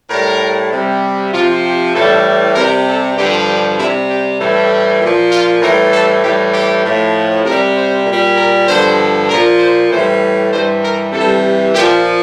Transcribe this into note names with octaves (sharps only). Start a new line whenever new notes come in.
A2 G3 A#4
C3 G3
C3 F3 F4
G4
A2 E3 G3 A4
C3 G3 A#4
A4
G2 D3 F3 G4
G4
C3 G3 E4
G4
A2 E3 G3 A4
A#2 F3
F4
A2 E3 G3 A#4
A4
A2 E3 G3 G4
G4
A2 F3
C3 G3 A#4
C5
A#2 G3
A#4
G2 D3 F3 C5
A#2 F3 A#4
C5
A2 E3 G3 C5
G2 E3 G3 C5
A#4
C3 E3 G3 A4
A#2 F3 G4